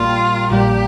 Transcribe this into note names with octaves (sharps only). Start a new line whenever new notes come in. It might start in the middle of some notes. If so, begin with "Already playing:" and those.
Already playing: A#1 A#2 G3 A#3 F4
A#1 A#2 G3 A#3 G4